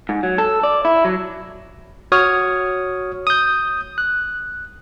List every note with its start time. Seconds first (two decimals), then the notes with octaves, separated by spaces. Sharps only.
0.09 G#2
0.23 F#3
0.38 A4
0.63 D5
0.85 E4
1.05 F#3
2.12 F#4 C#5 D#6 F6
3.27 D#6 G6
3.98 F#6